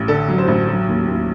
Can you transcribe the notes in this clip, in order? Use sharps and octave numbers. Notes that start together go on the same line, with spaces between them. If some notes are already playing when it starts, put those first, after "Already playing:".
Already playing: A1
D3 A4
F#3
C5
A1
F#3
D#2
D#2